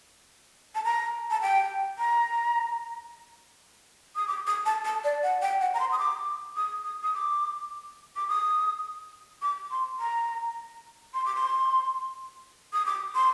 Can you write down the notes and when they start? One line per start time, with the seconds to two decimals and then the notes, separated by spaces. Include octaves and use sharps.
0.75 A5
0.85 A#5
1.31 A5
1.42 G5
1.99 A#5
4.16 D#6
4.28 D6
4.47 D#6
4.66 A5
4.85 A5
5.04 D5
5.23 F#5
5.42 G5
5.61 F#5
5.74 A#5
5.80 C6
5.92 D#6
5.99 D6
6.56 D#6
6.84 D#6
7.03 D#6
7.14 D6
8.16 D6
8.28 D#6
9.42 D6
9.71 C6
10.00 A#5
11.14 C6
11.26 D6
11.35 C6
12.73 D#6
12.86 D6
13.15 C6